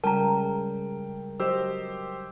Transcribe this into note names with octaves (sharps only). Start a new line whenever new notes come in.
C#3 G3 G#3 A#4 G5 A5 A#5
F#3 G4 C5 D#5 E6